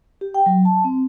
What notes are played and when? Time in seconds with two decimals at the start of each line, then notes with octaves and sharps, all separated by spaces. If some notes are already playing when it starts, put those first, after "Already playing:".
0.21 G4
0.34 G5
0.46 F#3
0.65 A5
0.84 C4